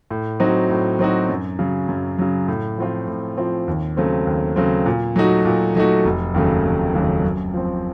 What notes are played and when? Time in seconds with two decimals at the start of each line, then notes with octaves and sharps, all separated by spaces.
0.11 A2
0.40 F#3 C4 D#4 F#4
0.70 A2
0.99 F#3 C4 D#4 F#4
1.29 F#2
1.59 C#3 F#3
1.88 F#2
2.18 C#3 F#3
2.48 A2
2.78 F3 C4 F4
3.07 A2
3.37 F3 C4 F4
3.68 D#2
3.97 C#3 F#3 A3 C4
4.27 D#2
4.56 C#3 F#3 A3 C4
4.86 A#2
5.16 F#3 A3 D#4 F#4
5.45 A#2
5.75 F#3 A3 D#4 F#4
6.05 F1
6.34 D#2 C#3 F#3 A3
6.64 F1
6.94 D#2 C#3 F#3 A3
7.24 F#2
7.53 F3 C4